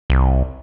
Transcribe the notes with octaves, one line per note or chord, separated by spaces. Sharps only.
C2